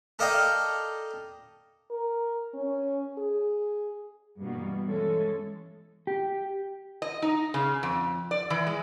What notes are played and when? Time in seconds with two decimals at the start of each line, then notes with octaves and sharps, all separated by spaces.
0.19 A4 A#4 D5 D#5 F5 G5
1.91 A#4
2.54 C#4
3.18 G#4
4.39 G2 B2 E3 G3 A#3 B3
4.86 E3 G#3 C#4 A4
6.07 G4
7.02 D#5
7.22 D#4
7.54 C#3
7.83 F2
8.31 D5
8.50 E3
8.67 G#3